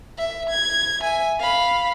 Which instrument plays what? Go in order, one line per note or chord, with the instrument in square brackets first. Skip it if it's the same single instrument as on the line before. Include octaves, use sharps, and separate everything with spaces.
[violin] E5
G#6
E5 G#5
F5 B5